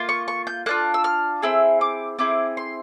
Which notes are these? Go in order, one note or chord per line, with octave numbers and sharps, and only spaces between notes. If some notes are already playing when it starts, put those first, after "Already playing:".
Already playing: A#3 F4
C#6
C#6
G6
A#3 D4 F4 F#6
E6
F6
C4 E4 G#4 E6
D6
C4 E4 G#4 D6
C6